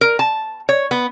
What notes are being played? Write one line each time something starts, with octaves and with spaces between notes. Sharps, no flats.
A#4
A5
C#5
B3